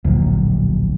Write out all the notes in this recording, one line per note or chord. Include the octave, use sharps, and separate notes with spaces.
D1 A#1 A#2 F#3